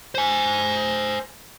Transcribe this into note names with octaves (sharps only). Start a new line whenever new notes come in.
C5 G#5